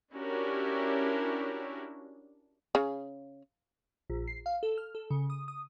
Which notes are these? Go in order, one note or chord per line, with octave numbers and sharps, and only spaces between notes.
C#4 D4 E4 F#4 G4 A#4
C#3
A#1
C7
F5
A4
F6
A4
C#3
D#6
D#6